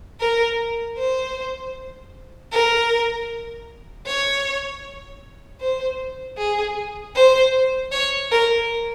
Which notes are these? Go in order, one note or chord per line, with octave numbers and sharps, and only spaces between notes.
A#4
C5
A#4
C#5
C5
G#4
C5
C#5
A#4